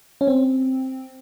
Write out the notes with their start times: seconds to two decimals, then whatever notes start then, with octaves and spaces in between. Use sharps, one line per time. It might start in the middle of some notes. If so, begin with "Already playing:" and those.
0.21 C#4
0.28 C4